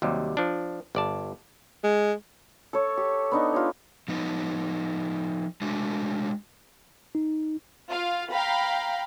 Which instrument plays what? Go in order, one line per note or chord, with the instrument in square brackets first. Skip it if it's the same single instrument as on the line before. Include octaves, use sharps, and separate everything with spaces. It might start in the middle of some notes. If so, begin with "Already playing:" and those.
[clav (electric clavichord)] D#2 C3 F#3 G3
F3 D4
G1 D5 A5
[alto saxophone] G#3
[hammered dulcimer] A4 C#5
G4
B3 D4 D#4
F4 G4 C#5
[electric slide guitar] F3 B3 D#4
G#3 A3 D4 F#4
[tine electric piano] D#4
[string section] F4 F5
F5 G5 A#5 B5